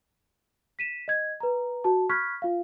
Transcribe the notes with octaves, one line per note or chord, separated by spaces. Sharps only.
B6 D#7 E7
D#5 G#6
B4 A#5
F#4 A5
B5 C#6 F6 F#6 G#6 B6
F4 F5